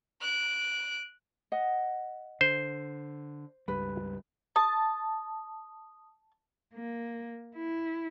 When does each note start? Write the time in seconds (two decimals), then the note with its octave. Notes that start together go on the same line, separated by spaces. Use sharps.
0.21 F#6 D7
1.52 D#5 F#5
2.41 D3 C5
3.68 C#2 G2 G3 B4
4.56 A5 D#6
6.74 A#3
7.55 E4